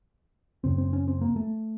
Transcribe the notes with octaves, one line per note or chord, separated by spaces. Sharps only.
F#2 C#3 C4
C4
C#4
C4
A#3
A3